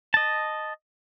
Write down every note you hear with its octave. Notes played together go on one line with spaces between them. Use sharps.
D#5 A5